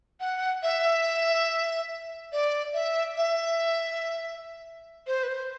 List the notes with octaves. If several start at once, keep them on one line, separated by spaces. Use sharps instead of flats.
F#5
E5
D5
E5
E5
C5
B4
C5